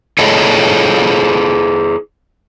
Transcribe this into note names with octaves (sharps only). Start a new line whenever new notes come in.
E4 G#4 A4 C#5 D#5